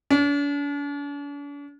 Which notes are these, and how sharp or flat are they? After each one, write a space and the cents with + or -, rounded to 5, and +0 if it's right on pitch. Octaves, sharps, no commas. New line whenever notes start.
D4 -45